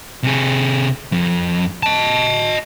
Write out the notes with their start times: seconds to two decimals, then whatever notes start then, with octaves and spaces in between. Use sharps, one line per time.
0.24 C3 G#4
1.12 F2
1.83 D#5 A5